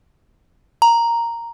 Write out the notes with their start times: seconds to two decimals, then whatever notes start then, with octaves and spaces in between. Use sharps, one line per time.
0.82 A#5